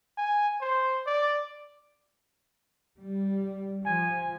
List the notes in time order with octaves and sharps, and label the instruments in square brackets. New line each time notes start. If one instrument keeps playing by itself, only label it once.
[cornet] G#5
C5
D5
[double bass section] G3
[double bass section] F3 [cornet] G#5